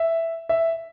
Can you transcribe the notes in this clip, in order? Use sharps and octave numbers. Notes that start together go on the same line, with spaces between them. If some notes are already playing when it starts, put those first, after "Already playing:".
Already playing: E5
E5